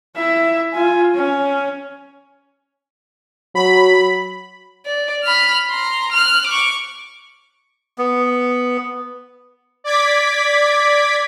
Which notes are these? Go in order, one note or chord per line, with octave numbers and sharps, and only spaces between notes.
E4 E5
F4 G#5
C#4
F#3 B5
D5
B5 F6
A#5 C6
F6 F#6
C#6 D6
B3
D5 D6 G#6 B6